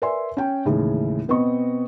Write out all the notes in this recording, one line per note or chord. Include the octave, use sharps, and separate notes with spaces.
A#4 B4 D5 E5 G#5 C6
C#4 G5
D#2 A2 C#3 E3 G#3 C#4
B2 B3 C4 D#5 C#6